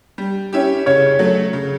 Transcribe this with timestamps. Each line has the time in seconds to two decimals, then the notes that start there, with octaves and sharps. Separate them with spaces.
0.18 G3
0.53 C#4 E4 G4
0.86 C#3 C#5
1.19 F#3 A3
1.53 C#3